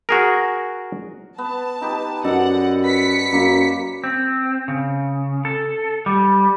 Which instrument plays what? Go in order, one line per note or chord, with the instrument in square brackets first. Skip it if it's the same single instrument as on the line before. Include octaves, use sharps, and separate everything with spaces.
[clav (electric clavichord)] F#4 G#4 A#4
[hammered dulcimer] B3 [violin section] A5
[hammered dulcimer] D#4 G4 B4
[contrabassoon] F#2 [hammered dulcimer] A4 D5 D#5 [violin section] F#5
[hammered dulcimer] B4 [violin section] B6 C#7
[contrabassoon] F#2 [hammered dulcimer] A#3
[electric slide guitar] C4
C#3
A4
G3